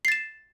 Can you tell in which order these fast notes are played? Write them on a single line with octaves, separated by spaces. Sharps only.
C7 A6 E7